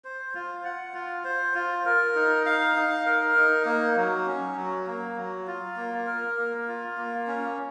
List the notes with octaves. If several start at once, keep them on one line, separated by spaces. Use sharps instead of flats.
C5
F4
F#5
F4
C5
F4
A#4
D#4
F5
D#4
A#4
D#4
A#3
F#3
C#4
F#3
A#3
F#3
F4
A#3
A#4
A#3
F4
A#3
C#4